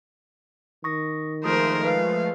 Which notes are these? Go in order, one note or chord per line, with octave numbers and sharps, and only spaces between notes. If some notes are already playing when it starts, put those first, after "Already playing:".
D#3 C#6 D#6 A#6
F3 G#3 A3 A#4 C5 C6 D#6
B4 F5